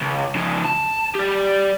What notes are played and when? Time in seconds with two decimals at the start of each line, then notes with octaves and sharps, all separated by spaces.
0.02 C#2
0.35 C#3 F3
0.64 A5
1.15 G4 D5